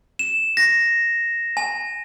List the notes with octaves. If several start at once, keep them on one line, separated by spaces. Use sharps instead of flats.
E7
A#6
G#5